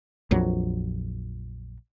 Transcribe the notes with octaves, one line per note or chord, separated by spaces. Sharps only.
A#1 F2 F#3